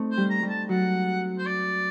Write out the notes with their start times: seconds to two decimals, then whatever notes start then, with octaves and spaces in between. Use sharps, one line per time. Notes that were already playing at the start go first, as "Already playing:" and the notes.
Already playing: A3 C4 D#4
0.11 C5
0.17 G3
0.30 A#5
0.43 G3
0.49 A5
0.69 F#3 F#5
1.38 C5
1.46 D5